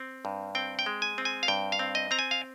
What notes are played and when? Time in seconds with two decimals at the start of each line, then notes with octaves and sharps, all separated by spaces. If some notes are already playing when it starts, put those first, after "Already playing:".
Already playing: C4
0.25 G2
0.55 C4 G5
0.79 G5
0.86 G#3
1.02 G#5
1.18 C4
1.25 G#5
1.43 F5
1.48 G2 G5
1.72 F5
1.79 C4
1.95 D#5
2.11 C4 A#5
2.19 G#5
2.31 F5